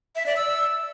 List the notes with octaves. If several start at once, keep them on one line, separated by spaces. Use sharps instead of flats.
E5
D5
E6